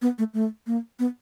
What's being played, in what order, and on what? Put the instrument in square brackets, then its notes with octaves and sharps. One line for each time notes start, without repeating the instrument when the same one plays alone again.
[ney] B3
A3
A3
A#3
B3